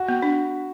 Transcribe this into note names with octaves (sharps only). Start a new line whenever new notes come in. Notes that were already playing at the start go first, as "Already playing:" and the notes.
Already playing: F#4
B3
D4